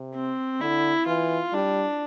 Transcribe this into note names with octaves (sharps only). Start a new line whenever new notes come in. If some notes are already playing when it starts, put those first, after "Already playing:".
Already playing: C3
C4
D3 E4
E3 F4
G3 D4